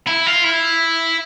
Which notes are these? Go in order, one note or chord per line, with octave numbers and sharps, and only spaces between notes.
E4
F4
E4